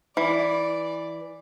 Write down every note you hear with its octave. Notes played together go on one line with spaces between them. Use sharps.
E3 D5